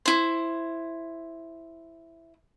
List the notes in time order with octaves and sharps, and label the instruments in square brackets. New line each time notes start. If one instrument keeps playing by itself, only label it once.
[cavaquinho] E4 C5